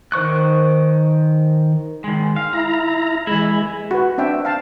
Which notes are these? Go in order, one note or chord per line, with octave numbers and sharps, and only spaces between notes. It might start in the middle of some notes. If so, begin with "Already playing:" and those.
D#3 C5 C#6 F#6
D#3 G#3
F5
E4 A#5
E3 G#3 E4
F#4 B4
C4 D4 E5 G5
F5 A5